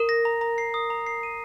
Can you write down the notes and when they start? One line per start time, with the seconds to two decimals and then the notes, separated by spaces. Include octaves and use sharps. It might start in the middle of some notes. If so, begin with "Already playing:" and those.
Already playing: A#4
0.09 A#6
0.25 A#5
0.41 A#5
0.58 C7
0.74 D#6
0.90 A#5
1.06 C7
1.23 D#7